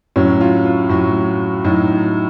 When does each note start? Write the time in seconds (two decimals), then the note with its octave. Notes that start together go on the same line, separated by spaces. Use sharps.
0.16 A2 F#3 C#4
0.41 F4
0.65 F4
0.89 A2 F#3 F#4
1.64 A2 F#3 D#4